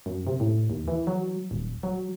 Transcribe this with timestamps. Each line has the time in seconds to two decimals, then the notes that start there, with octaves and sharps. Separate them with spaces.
0.06 F#2
0.27 C3
0.40 A2
0.70 D#2
0.88 E3
1.07 F#3
1.51 D#1
1.83 F#3